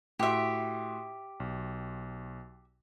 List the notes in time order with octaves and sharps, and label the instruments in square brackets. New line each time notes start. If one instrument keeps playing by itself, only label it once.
[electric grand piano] A2 F#4 C6 [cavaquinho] G4 E5
[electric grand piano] B1